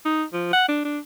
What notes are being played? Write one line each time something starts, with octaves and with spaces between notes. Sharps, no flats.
D#4
F3
F#5
D4
D4